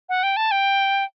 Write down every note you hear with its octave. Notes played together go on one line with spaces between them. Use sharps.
F#5
G5
A5
G5